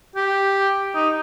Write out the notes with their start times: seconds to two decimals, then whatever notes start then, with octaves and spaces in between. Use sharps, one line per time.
0.16 G4
0.95 D#4